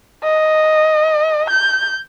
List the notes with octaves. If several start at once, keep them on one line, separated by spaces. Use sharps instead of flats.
D#5
G6